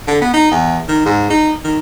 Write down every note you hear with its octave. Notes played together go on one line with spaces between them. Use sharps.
D3
B3
D#4
E2
D#3
G#2
D#4
D#3